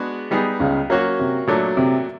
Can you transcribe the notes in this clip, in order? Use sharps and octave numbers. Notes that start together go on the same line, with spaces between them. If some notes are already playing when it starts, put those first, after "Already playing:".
Already playing: G#3 B3 D4 F#4
G3 B3 D#4 G#4
C#2 C#3
F#3 A#3 C#4 F#4
C3
A#2 F#3 A3 D4
C3